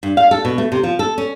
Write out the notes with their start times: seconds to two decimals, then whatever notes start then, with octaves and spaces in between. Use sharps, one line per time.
0.03 G2
0.17 F5
0.31 A4
0.45 B2
0.58 A3
0.72 C3
0.83 F3
0.99 A4
1.18 C#4